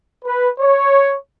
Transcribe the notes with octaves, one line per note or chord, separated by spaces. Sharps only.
B4
C#5